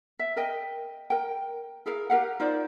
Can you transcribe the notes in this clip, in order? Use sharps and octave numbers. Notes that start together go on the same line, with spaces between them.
E5
A#4 D#5 G5
A#4 G5
E4 G#4 A#4 F5
G4 A#4 F5 F#5
D#4 F4 C5 D5